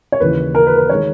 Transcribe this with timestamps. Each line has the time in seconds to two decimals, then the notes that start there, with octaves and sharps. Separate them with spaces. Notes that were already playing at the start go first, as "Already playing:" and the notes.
0.12 C#5
0.20 D#2 C#3 E3 B4
0.55 A#4
0.67 B4
0.78 B4
0.90 D#3 G#3 C#5